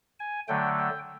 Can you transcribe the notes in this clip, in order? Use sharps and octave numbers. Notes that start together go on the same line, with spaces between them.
G#5
D3 F#3 A3 G5
G5